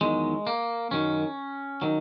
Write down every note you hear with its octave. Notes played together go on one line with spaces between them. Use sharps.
E2 D#3 F#3 G#3
A#3
F#2 D#3 F#3 C#4
D#3 F#3